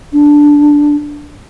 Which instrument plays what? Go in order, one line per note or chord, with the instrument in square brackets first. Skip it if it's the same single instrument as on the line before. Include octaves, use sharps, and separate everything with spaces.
[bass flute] D4